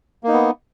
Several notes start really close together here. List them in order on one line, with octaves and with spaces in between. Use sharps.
A#3 D#4 B3